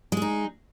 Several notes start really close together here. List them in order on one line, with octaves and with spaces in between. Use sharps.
G#3 G#4 D#4